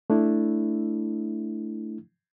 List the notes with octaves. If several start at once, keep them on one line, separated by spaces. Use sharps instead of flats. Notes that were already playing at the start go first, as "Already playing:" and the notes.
A3 D4 E4